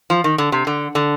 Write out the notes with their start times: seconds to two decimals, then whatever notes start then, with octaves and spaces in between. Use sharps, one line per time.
0.10 F3
0.24 D#3
0.38 D3
0.52 C3
0.67 D3
0.95 D3